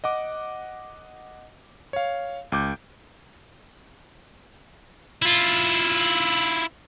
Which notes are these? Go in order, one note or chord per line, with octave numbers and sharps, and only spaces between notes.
D#5 F#5 D6
C#5 F5
C#2 D6 G6
E4 F4